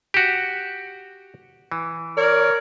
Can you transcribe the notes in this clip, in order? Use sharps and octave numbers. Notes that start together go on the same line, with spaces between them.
F#4 G4
E3
A#4 C#5 D5